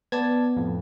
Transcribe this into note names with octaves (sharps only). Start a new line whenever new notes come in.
B3 D5 A5 G#6
F2 A2